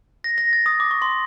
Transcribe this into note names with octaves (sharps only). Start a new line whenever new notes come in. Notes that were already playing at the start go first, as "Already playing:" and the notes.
A#6
A#6
A6
D#6
D6
C#6
C6